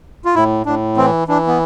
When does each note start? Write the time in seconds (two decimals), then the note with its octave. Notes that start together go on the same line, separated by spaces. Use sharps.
0.25 F4
0.35 A2 E4
0.66 A2 D4
0.97 E3 C4
1.28 E3 D4
1.47 B3